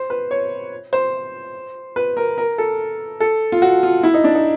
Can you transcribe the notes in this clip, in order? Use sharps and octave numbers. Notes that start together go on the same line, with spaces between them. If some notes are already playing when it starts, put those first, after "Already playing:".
Already playing: C5
B4
C#5
C5
B4
A#4
A#4
A4
A4
F4
F#4
F4
E4
D#4
D4
D#4